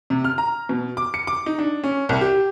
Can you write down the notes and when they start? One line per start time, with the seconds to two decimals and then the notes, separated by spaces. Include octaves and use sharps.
0.10 C3
0.24 F6
0.38 A#5
0.69 B2
0.97 D6
1.14 C#7
1.27 D6
1.46 D#4
1.59 D4
1.84 C#4
2.09 C2
2.21 G4